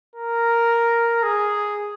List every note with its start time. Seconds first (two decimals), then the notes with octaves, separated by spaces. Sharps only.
0.16 A#4
1.23 G#4